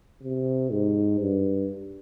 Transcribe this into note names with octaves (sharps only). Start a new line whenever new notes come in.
C3
G#2
G2